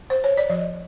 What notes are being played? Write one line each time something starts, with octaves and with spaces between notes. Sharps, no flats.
C5
C#5
D5
F3 D#5